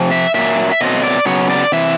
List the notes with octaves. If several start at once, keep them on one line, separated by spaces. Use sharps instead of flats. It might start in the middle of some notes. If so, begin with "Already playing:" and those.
Already playing: C3 F3
E5
A#2 F#3 A#3 E5
E5
B2 F#3 A3 C4 D#5
D5
C#3 F#3 B3 C#5
D5
C3 E3 E5